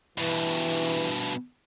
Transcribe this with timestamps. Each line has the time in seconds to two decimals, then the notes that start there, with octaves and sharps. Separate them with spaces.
0.18 G2 B2 E3